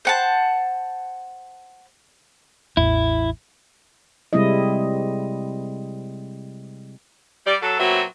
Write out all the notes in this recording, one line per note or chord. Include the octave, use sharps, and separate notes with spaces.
C5 F#5 A5
A1 E2 E4
C3 G3 G#3 C4 E4 D#5
G3 D5
F#3 A4
A#2 F#3 B3 C4 F#4 E5